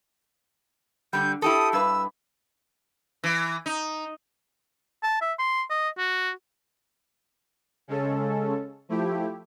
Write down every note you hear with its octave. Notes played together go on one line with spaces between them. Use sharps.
D3 G3 G6
E4 G4 A4 D#6
G2 B4 E6
E3
D#4
A5
E5
C6
D#5
F#4
C#3 G#3 C#4 A4
F3 A3 E4 G4